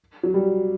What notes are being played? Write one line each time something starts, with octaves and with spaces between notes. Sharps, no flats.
F#3
G3